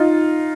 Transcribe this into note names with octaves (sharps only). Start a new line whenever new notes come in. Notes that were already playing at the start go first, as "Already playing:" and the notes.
Already playing: D#4 F4